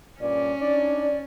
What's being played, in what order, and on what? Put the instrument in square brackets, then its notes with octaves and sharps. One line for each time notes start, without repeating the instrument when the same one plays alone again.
[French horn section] G2 A#2 D5 [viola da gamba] C#4
[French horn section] D4 D#4 [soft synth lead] D5